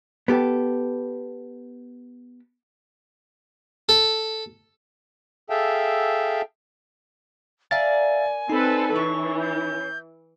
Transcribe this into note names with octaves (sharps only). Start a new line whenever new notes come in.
B3 G4 A4
A4
G#4 A4 E5 F5 G5 A5
A#4 D5 E5 F5 G#5 A6
C4 D#4 A4 B4
E3 C#4 C#6
G6